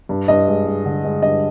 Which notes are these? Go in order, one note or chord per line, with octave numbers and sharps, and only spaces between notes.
G2
G2 D#5
G#3
G#3
D3
G#3
G2 D#5